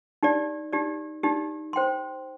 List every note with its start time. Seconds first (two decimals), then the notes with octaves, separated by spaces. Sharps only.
0.23 D#4 G4 D5
0.73 D#4 G4 D5
1.23 D#4 G4 D5
1.73 C5 G5 C6